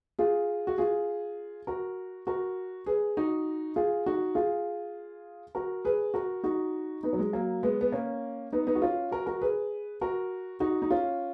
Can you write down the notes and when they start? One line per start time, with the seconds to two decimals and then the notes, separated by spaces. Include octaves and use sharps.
0.19 F4 G#4
0.67 F#4
0.78 F4 G#4
1.67 F#4 A#4
2.27 F#4 A#4
2.86 G#4 B4
3.17 D#4 F#4
3.76 F4 G#4
4.06 D#4 F#4
4.35 F4 G#4
5.55 F#4 A#4
5.85 G#4 B4
6.14 F#4 A#4
6.44 D#4 F#4
7.03 B3 D#4
7.13 F#3
7.19 G#3
7.33 F#3 A#3
7.63 G#3 B3
7.81 B3
7.92 A#3 C#4
8.53 B3 D#4
8.67 B3 D#4
8.75 F#4
8.82 C#4 F4
9.11 F#4 A#4
9.26 F#4 A#4
9.41 G#4 B4
10.01 F#4 A#4
10.60 D#4 F#4
10.82 D#4
10.90 C#4 F4